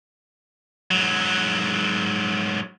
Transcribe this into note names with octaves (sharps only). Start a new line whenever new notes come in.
G#2 F#3